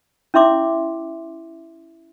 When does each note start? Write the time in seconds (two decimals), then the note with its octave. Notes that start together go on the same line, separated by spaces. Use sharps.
0.34 C#4 E4 E5 C6 D6